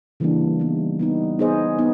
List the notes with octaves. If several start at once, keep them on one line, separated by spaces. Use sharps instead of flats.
C#3 E3 G3 A#3 D4
G3 B3 D#4
G3 B3 D#4
B3 D#4 G#4 C5 D#5
B3 D#4